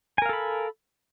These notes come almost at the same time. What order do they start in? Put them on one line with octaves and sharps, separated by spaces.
G#5 A#4 F5 A4 B5